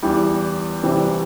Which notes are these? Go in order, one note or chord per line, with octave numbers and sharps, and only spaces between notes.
E2 E3 G3
C2 C3 E3 G3